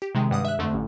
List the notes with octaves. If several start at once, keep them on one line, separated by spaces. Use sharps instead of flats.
G4
C3 D#3 G#3
G2 F#5 D#6
E5 F#6
F2 D3 A3
A1